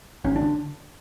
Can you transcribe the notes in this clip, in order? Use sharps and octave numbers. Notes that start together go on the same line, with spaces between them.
G#1 C#4
D4
D3